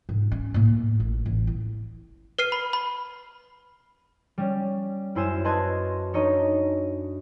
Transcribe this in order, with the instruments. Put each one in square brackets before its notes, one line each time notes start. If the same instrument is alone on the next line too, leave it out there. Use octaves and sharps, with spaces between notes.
[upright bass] G#2
C#4
A2 A#3
A1
A1
E4
[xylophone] B4 F6 C7 D#7
B5
B5
[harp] G3 C#4
F#2 E4 C5 G#5 E7
B4 D#5 A5 C6 F#6 G#6
D4 D#4 C#5 D#5 A#5